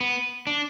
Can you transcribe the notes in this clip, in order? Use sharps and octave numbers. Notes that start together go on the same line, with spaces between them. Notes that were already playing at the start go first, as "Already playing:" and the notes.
B3
D4